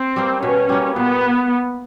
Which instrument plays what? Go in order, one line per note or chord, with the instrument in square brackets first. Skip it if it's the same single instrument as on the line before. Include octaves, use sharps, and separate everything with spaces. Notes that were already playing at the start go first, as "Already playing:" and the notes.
Already playing: [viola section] C4
[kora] G3 A#3
[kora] B2 [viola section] C#4
[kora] G3 A#3
[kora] A#2 [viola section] B3